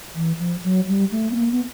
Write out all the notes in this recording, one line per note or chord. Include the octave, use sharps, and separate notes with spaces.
E3
F3
F#3
G3
A3
B3
A#3
B3